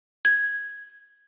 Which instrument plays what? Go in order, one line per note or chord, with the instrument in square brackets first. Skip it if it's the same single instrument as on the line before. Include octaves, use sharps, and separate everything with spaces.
[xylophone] G#6